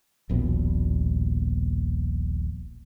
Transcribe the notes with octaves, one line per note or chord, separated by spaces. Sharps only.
D#1 A#1 B2